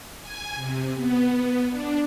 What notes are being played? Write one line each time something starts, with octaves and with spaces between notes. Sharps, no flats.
G#5
C3
B3
D4